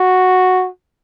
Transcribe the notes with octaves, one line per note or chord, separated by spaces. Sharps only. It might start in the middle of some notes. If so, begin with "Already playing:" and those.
Already playing: F#4